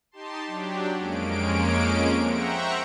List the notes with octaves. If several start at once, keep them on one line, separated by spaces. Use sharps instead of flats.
D#4 G4 A5 C6
F#3 D4 G4
F2 G#3 A#3 C#4 D7
C5 E5 F#5 G5 A#5 C#6